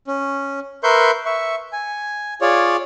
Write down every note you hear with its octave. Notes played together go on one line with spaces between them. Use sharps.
C#4
A#4 B4 E5 C6 C#6 G6
E5 C#6
G#5
F4 G#4 C#5 D5